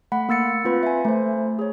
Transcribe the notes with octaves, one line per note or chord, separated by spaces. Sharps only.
A3 F#5 B5
A#3 E6 A6 C#7
C4 F4 B4 B5
E5 G#5
A3 C5
G#4 C#5